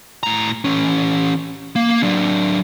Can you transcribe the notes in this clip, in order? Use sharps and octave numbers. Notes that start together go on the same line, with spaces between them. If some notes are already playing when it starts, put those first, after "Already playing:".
A2 A#5
E3 C#4
A#3
F#3 D4